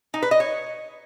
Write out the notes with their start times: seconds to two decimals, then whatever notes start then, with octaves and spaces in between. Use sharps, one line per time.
0.14 D#4
0.22 B4
0.31 D#5
0.40 C#5